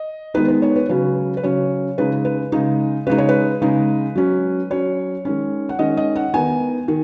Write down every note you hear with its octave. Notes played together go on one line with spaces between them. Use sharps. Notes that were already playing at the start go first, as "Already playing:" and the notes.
Already playing: D#5
D#3 G#3 B3 D#4 B4
B4
C#5
B4
C#3 F#3 C#4 B4
B4
C#3 F#3 C#4 C#5
C#3 G#3 D#4 B4
B4
C#3 G#3 D#4
C#3 G#3 D#4 B4
C#5
B4
C#3 G#3 D#4
F#3 C#4
F#3 C#4 C#5
D#3 G#3 C#4
F#5
D#3 G#3 C#4 D#5
D#5
F#5
D#3 B3 D#4 G#5
D#3